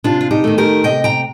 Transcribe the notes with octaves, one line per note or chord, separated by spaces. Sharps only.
C3 D4 F4
F4
D#4 G4
D#3 A3
G4 A#4
C3 D#5 G5
G5 A#5